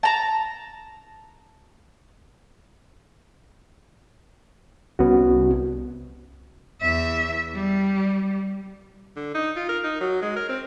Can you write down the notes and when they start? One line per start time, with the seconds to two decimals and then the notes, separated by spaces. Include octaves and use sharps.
0.03 A5 A#5
4.99 C2 B3 C#4 F#4
6.81 E2 E5
7.55 G3
9.16 D3
9.35 D#4
9.56 F4
9.69 A#4
9.84 D#4
10.01 F#3
10.22 G#3
10.36 A#4
10.49 C4